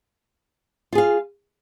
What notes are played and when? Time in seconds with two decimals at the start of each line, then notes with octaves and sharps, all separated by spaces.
0.93 F4
0.95 G#4
0.98 F5